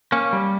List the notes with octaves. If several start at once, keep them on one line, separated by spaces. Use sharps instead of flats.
A#3 C#4
G3